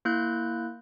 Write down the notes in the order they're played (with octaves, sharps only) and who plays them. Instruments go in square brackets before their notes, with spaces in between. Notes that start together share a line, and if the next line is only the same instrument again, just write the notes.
[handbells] A#3 E4 F#6 G6